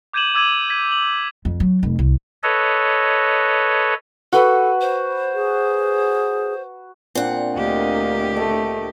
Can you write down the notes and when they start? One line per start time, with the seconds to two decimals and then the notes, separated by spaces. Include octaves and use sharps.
0.13 D6 G6 G#6 D#7 E7 F#7
0.34 D6 E6 G#6 D#7 F#7
0.70 G#6 B6 D#7
0.92 F#7
1.45 F2
1.60 F#3
1.83 F1
1.99 C2
2.43 A4 B4 C#5 D#5
4.33 F#4 A4 B4
4.81 C5
5.35 G#4
7.15 A#2 C4 D4 F#5 C#6
7.56 D2 A#3 G4 D#5
8.37 A3 D#5